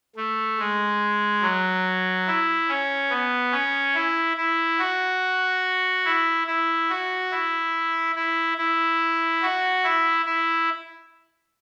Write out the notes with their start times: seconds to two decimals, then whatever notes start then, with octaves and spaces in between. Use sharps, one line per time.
0.16 A3
0.58 G#3
1.42 F#3
2.27 E4
2.69 C#4
3.10 B3
3.52 C#4
3.95 E4
4.37 E4
4.79 F#4
6.05 E4
6.47 E4
6.89 F#4
7.31 E4
8.15 E4
8.57 E4
9.42 F#4
9.84 E4
10.25 E4